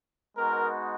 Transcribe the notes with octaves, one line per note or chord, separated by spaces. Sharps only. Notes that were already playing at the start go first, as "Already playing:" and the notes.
G#3 B3 D#4 F#4 A#4